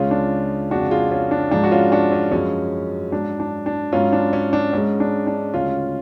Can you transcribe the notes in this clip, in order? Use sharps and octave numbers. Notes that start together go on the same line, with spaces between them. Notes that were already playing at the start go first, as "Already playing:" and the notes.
Already playing: C#2 C#3 G#3 C#4 F4
D4
F2 C#3 G#3 D4 F#4
F4 G#4
C#4 F4
D4
G#2 F3 G#3 D4
F#4
C#4 F4
D4 F#4
C#4
F#2 F3 G#3 C#4
G#2 F#3 D4
D4
D4
G#2 F#3 C#4 F4
D4
C#4
D4
G#2 G#3 C#4
D4
D4
D2 C#3 G#3 C#4 F4